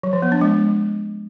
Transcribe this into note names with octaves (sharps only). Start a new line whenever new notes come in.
F#3
F3
B3
D4
G#3